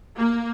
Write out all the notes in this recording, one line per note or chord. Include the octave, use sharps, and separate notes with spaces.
A#3